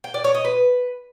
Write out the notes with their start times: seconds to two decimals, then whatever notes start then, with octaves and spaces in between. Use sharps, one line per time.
0.04 G5
0.14 D5
0.24 C#5
0.34 D#5
0.45 B4